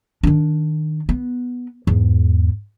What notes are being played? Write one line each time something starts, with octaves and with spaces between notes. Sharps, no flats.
D#3 D4
B3
E2 G#2